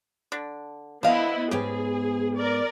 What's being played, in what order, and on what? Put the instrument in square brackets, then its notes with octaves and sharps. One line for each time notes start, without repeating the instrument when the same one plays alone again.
[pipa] D3 D4
[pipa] D3 F5 [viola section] B3 E4 [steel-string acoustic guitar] C5 D#5
[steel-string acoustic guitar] G#2 B3 [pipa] C#4 G4 [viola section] G#4
[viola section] A#4 D5